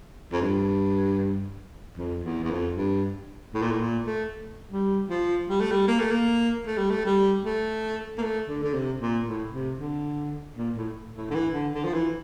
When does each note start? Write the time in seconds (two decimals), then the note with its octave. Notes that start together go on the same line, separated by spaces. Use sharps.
0.32 F2
0.42 G2
1.97 F2
2.23 E2
2.44 E2
2.50 F2
2.76 G2
3.54 A2
3.62 A#2
3.71 A2
3.79 A#2
4.06 A3
4.71 G3
5.09 F3
5.49 G3
5.61 A3
5.72 G3
5.88 A#3
5.99 A3
6.10 A#3
6.67 A3
6.78 G3
6.90 A3
7.05 G3
7.45 A3
8.18 A#3
8.22 A3
8.48 D3
8.63 D3
8.74 C3
9.01 A#2
9.26 A2
9.53 C3
9.79 D3
10.57 A#2
10.76 A2
11.16 A2
11.31 D3
11.35 E3
11.54 D3
11.74 D3
11.85 F3
11.94 E3